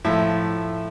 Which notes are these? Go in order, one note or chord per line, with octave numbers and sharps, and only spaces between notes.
A2 F3 E5